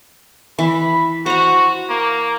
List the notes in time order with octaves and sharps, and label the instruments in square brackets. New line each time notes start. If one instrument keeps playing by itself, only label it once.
[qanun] E3 [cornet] B5
[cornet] F#4 [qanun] C5 A#5
[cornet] A#3